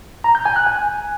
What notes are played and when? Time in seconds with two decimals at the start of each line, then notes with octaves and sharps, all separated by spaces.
0.24 A#5
0.35 G6
0.45 G#5
0.56 F#6
0.67 G#5